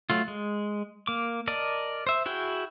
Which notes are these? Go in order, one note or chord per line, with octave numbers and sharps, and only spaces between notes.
F#3 A3 F4
G#3
A#3 D6
A#4 D5 D#5 A5
C5 E5
E4 F#4 G#4 G5